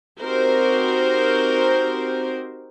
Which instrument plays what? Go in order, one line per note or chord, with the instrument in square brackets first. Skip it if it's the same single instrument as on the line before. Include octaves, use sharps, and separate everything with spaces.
[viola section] C4 D#4 F#4 G4 A#4 C5